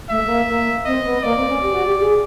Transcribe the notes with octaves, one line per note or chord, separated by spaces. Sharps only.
A3 E5
A3
A#3
A#3
C4 D#5
B3
A#3 D5
C4
C#4
G4
F#4
G4
G#4